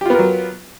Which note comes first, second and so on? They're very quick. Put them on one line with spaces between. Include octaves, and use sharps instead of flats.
G4 F4 B3 A#4 F#3